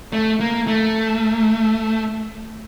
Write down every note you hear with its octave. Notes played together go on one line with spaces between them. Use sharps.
A3
A#3
A3